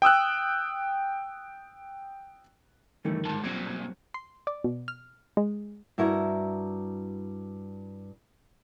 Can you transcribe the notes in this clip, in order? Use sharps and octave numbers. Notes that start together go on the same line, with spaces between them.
G5 D#6 E6 F#6
G1 D#3 E3 G3 A3 A#4
F2 G#2 A5
B1 G2 A#2 F#3 C4 G#6
G#6
C6
D5
B2
F6
G#3
G2 E4 F#4 A#4